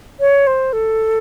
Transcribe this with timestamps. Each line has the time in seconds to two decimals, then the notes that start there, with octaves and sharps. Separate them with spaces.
0.20 C#5
0.47 C5
0.73 A4